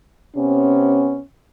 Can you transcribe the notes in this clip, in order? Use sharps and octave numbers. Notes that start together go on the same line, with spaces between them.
C3 B3 C#4